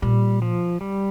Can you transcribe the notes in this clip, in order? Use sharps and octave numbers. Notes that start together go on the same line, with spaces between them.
A#2 G3
F3
G3